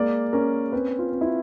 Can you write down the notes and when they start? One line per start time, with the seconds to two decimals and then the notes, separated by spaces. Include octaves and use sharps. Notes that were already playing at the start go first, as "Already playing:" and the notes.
Already playing: G#3 A#3 D5
0.33 C#4 A#4
0.72 C4 B4
0.99 F4
1.12 C4
1.21 E4
1.26 F4